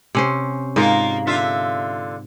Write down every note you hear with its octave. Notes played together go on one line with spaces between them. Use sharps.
C3 C#4 C5
G#2 A#3 D#4 F4 A#4
D3 F4 E5